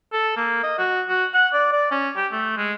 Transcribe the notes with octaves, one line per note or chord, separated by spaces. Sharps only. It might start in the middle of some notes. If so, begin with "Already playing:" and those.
A4
A#3
D#5
F#4
F#4
F#5
D5
D5
C#4
G4
A3
G#3